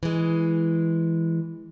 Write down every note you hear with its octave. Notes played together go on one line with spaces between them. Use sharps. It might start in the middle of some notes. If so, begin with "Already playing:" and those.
E3 G#3